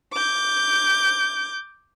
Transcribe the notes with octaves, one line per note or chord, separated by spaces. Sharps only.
D6 G6